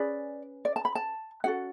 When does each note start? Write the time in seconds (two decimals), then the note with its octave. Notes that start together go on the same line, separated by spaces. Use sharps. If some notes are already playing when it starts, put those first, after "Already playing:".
Already playing: C#4 G#4 B4 D5
0.65 D5
0.76 A5
0.85 B5
0.95 A5
1.44 C#4 F#4 A4 F#5